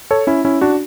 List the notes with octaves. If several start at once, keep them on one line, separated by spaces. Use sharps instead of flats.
A4 C#5
C#4 E4
C#4 E4
D4 F#4